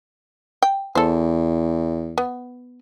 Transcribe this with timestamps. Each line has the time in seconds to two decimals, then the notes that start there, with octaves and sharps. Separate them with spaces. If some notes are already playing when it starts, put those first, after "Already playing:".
0.63 G5
0.95 E2 A4 C5
2.18 B3